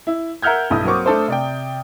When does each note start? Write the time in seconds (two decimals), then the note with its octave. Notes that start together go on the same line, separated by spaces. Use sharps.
0.07 E4
0.42 A#4 E5 F#5 F6 G6 G#6
0.70 B1 G2 E4 D#6
0.85 F#3 A#3 C4 C#6 D6
1.06 A3 D4 A4 C5
1.28 C3 D5 G5